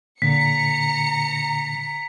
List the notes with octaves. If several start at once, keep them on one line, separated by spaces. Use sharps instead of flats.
A#2 D3 A#5 B6 C#7